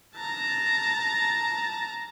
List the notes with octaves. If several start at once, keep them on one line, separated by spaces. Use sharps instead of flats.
A5 A#5